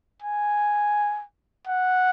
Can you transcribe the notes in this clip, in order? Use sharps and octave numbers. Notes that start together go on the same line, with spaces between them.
G#5
F#5